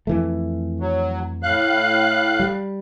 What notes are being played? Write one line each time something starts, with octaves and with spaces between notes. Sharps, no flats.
F2 E3 A3
F#3
A2 F5 F#6
G3